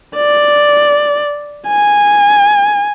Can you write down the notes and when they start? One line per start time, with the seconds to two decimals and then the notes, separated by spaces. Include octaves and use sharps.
0.16 D5
1.68 G#5